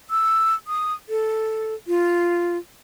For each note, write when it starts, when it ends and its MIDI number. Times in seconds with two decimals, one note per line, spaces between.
0.10 0.55 88
0.67 0.93 87
1.09 1.74 69
1.88 2.57 65